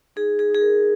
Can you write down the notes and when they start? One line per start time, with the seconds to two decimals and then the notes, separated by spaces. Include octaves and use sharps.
0.16 D#4 G#4
0.39 G#4
0.50 D#4 G#4
0.61 A#4